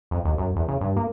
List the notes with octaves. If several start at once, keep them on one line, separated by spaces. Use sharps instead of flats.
F2
D#2
F#2
E2
C#3
G2
A#3